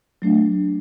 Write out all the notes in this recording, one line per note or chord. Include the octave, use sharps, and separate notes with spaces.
F#3 A3 D4